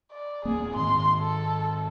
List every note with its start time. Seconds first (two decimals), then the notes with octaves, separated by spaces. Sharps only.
0.12 D5
0.45 D1 A#3 C4 G#4
0.76 G#2 D#3 C6
1.20 A4